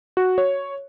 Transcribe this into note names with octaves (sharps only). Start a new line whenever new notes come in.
F#4
C#5